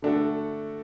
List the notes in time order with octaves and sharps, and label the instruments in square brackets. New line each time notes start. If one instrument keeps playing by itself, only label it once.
[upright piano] D3 A3 D4 F#4 A4